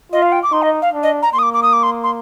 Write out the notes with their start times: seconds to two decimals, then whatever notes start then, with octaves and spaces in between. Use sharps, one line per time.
0.12 F4 D#5
0.22 F5
0.32 G5
0.43 D6
0.52 D#4 C6
0.62 D#5
0.82 F5
0.93 D4
1.03 D#5
1.22 A#5
1.33 A#3 C6
1.39 D#6
1.43 D6
1.53 D6
1.62 D#6
1.73 D6
1.83 C6
2.03 C6